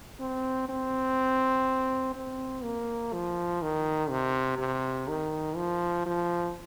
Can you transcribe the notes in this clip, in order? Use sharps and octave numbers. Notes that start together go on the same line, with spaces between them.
C4
C4
C4
A#3
F3
D#3
C3
C3
D#3
F3
F3